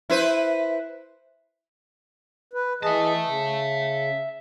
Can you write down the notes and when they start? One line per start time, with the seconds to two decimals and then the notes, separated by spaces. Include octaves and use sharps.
0.10 E4 B4 C5
2.54 B4
2.83 E3 G#4 D#5 E5 A5
3.27 C#3